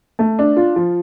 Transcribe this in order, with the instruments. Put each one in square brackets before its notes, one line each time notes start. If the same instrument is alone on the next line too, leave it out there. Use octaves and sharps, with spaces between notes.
[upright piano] A3
D4
F4
F3